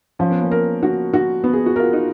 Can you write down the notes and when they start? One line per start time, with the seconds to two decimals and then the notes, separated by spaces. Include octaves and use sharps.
0.19 F3 C#4
0.31 B3
0.42 A#3 C#4
0.51 A#4
0.83 F#4
1.14 F#4
1.44 B3
1.53 G#4
1.66 F#4
1.76 F4 A#4
1.93 D#4